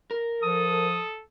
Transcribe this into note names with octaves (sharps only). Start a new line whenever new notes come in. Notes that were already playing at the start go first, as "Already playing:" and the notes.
A#4
F3 A4 D#6